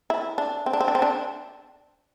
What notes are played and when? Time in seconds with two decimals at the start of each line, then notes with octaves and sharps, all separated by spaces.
0.10 E4
0.38 D4
0.66 C4
0.73 D4
0.80 C4
0.88 D4
0.95 C4
1.02 D4